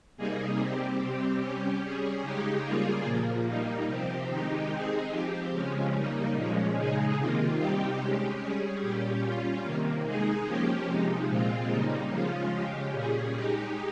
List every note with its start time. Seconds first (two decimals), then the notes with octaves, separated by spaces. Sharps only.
0.17 C3 G3 A#3 D#4 G#4
0.58 G3 C4 G4
1.00 C3 G3 C4 G4
1.40 G3 C#4 G4
1.82 G3 C#4 G#4
2.22 C#3 G#3 D#4 G4
2.64 C#3 G3 A#3 F4 G#4
3.04 A#2 F3 A#3
3.46 G3 A#3 D#4
3.87 C3 F3 C4 G4
4.28 D#3 G#3 D#4 G4
4.69 G#3 C4 D#4 G#4
5.11 F3 C4 G4
5.51 C#3 F3 G#3 C#4
5.93 C#3 G3 A#3 D#4
6.33 A#2 F3 G#3 C#4
6.75 C#3 G#3 D#4 G#4
7.16 C3 D#3 A#3 F4
7.57 C3 G3 C4 D#4 G4
7.99 G#3 C#4 G4
8.39 G3 C#4 G#4
8.81 A#2 G3 C#4 G4
9.22 G3 C#4 F4
9.63 C3 D#3 A#3
10.04 G#3 D#4 G#4
10.46 F3 A#3 C#4 G4
10.87 C3 F3 G#3 D#4
11.27 A#2 G#3 C4 F4
11.69 C#3 G3 A#3 D#4
12.09 C#3 F3 G#3 C#4 F4
12.51 C#3 G#3 C#4 G4
12.93 A#2 G3 C#4 G#4
13.33 G#3 D#4 G4